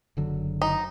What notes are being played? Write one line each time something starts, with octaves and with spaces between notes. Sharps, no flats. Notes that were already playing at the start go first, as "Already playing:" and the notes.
F#1 D3 F#3
D#4